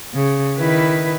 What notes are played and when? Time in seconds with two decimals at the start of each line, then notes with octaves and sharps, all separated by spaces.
0.14 C#3
0.56 D#3 E4 B4